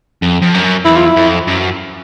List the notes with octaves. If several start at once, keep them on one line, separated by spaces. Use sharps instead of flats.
F2
F2
F#2
E2 E4
F4
E4
F2
F#2